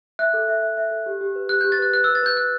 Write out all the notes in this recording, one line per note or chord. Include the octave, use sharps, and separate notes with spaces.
E5 F#6
A4
E5
E5
E5
A4
G4
G4
B4
G4 F#6
G4 G6
A6
B4 F#6
B4 F#6
B4 E6
A6
B4 G6
B4 F#6